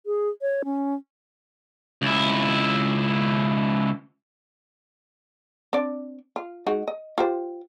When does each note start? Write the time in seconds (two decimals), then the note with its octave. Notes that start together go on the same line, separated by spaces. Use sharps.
0.06 G#4
0.42 C#5
0.65 C#4
2.02 C#2 E4
5.73 C4 D4 D5
6.36 F4
6.67 G#3 D#4 F#4
6.88 D#5
7.18 F4 G4 C5